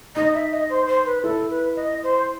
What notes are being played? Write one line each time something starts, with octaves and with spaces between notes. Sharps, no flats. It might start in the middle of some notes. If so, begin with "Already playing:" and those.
D#4 D#5
E5
D#5
C5
C5
B4
E4 A4
B4
D#5
C5